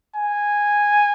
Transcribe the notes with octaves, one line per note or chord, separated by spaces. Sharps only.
G#5